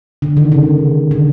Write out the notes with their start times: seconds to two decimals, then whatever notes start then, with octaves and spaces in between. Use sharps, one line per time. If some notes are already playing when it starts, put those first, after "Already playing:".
0.22 D3
0.37 D#3
0.52 C#3
1.11 D3